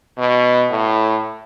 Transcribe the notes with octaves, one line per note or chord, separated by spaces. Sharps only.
B2
A2